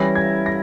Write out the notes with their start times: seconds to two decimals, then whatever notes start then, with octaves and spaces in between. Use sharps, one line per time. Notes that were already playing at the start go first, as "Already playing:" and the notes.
Already playing: E3 G3 C#4 E4 A#6
0.15 G#6
0.46 A#6